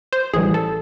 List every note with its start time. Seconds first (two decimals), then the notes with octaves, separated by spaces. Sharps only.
0.13 C5
0.34 A1 A2 E3 G3 G#4
0.54 A4